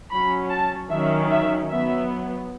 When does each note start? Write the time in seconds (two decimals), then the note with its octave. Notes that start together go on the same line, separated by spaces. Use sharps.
0.11 F#3 C#4 B5
0.50 A5
0.90 D#3 F#3 C#4 E5
1.30 E5
1.70 F#3 B3 E5